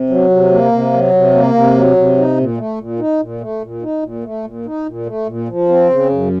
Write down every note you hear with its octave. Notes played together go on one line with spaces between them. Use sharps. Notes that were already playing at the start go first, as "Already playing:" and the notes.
Already playing: C3
F#3
C3
A#3
C3
F#3
C3
A#3
C3
F#3
C3
D#4
A#2
A3
A#2
D#4
A#2
A3
A#2
D#4
A#2
A3
A#2
D#4
A#2
A3
A#2
F3
C4
C#3
F#2